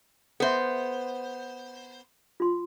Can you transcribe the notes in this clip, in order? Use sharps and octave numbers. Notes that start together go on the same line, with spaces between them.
B3 A4 C5 E5
F4 C6